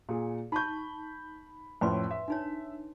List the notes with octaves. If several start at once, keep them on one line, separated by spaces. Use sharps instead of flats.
A#2 G#4
D#4 A5 B5 C#6 G6
F2 A2 C#4 B4 D5 C6
E5
D4 D#4 C#5